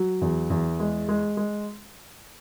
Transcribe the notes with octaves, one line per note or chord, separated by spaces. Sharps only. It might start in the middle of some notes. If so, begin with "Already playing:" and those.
Already playing: F#3
E2
E2
G#3
G#3
G#3